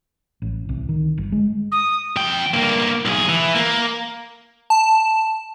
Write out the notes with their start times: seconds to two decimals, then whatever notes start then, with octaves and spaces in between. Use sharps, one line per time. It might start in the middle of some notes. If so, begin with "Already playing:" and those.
0.42 A1
0.69 C2
0.89 D#3
1.18 G1
1.32 G#3
1.71 D#6
2.16 F2 G5
2.54 G2 A#3
3.05 B1 G#4
3.29 E3
3.55 A#3
4.70 A5